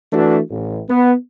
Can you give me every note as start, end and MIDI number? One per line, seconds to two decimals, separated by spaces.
0.13 0.39 52
0.13 0.39 57
0.13 0.39 62
0.13 0.39 66
0.50 0.80 33
0.89 1.13 59